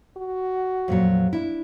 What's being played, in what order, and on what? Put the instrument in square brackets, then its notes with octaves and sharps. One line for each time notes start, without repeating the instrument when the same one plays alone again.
[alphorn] F#4
[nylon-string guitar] F2 A#2 F#3
D4 E4